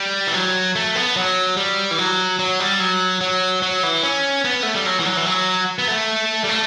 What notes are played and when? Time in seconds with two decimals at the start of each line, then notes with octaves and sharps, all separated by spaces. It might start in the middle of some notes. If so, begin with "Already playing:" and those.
Already playing: G3
0.27 E3
0.34 F#3
0.76 A3
0.96 B3
1.16 F#3
1.57 G3
1.91 E3
1.98 F#3
2.39 F#3
2.60 G3
2.80 F#3
3.21 F#3
3.62 F#3
3.83 E3
4.03 C#4
4.45 B3
4.63 A3
4.75 G3
4.86 F#3
5.00 E3
5.05 F#3
5.17 E3
5.26 F#3
5.78 B3
5.88 A3
6.44 G3
6.49 A3